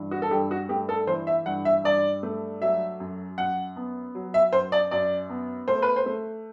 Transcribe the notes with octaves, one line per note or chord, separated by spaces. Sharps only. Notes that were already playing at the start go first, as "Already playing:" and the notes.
Already playing: G2 E3
F#4
A4
G2 G4
F#4
A3 G4
A4
E3 C5
E5
G2 F#5
E5
G2 D5
A3
F#3 E5
F#2
F#2 F#5
B3
F#3
E5
F#2 C5
D5
F#2 D5
B3
A3 C5
B4
C5
A3